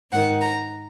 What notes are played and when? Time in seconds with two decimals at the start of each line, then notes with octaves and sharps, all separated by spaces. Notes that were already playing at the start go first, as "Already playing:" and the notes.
0.12 G#2 D#3 F#5
0.42 A#5